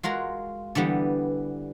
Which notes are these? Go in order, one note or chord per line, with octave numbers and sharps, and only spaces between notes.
G#3 F4 F#4 A#4
D3 E3 G3 B3